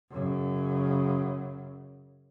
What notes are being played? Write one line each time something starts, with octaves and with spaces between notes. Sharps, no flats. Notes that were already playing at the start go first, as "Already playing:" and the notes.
F#2 C#3